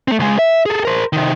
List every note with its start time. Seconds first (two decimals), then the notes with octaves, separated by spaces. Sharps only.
0.08 A3 C4
0.19 C#2 G#3
0.39 E5
0.66 G#4 A4
0.85 A#4 C5
1.13 C3 D#3